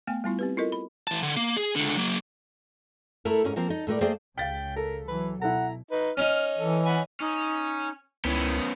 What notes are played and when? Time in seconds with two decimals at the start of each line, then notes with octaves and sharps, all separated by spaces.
0.07 A3 B3 G5 G#5
0.24 G3 B3 E4 F4
0.39 C4 G4 B4
0.57 E4 F4 A4 A#4 D#5
0.72 B5
1.08 E3 A5
1.23 D3
1.37 A#3
1.57 G#4
1.76 C#2 D3
1.97 F#3 A#3
3.25 A3 E4 A4 A#4
3.44 G#2 C#4 A#4
3.56 F3 A#3 C4 A#4
3.68 D#4 A4
3.87 A2 A3 A#4 D5
4.01 A3 A#3 G#4 C5 D5 G5
4.38 C#2 C#3 F5 G5 A6 B6
4.76 A4 A#4
5.08 E3 F#3 B4
5.42 B2 E4 A4 F#5 A#5
5.91 D#4 B4
6.17 C#4 D#4 F6
6.58 E3 A4
6.85 F#5 G#5 B5
7.20 C#4 D#4
8.25 C#2 D#3 B3 C#4 E4